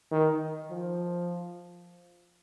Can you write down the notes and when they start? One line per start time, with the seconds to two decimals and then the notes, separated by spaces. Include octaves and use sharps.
0.11 D#3
0.71 F3